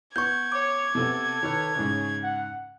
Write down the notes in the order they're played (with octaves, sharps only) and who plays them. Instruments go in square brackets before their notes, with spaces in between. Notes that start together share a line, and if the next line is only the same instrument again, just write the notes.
[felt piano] B3 [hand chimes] C#6 G6 [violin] G#6
[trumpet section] C#5 [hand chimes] D6
[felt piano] C3 B3 [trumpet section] A4
[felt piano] D#3 [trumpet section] A4 B4 C#5
[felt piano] G#2 C#3 [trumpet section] G#4 C#5
[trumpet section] F#5